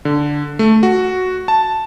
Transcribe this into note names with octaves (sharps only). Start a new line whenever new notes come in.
D3
A3
F#4
A5